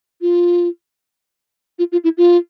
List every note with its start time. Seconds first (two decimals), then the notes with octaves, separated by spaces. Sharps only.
0.22 F4
1.79 F4
1.92 F4
2.04 E4
2.18 F4